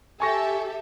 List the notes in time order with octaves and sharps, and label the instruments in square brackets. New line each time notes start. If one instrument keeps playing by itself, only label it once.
[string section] G4 A4 E5 [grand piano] G#5 C#6 A#6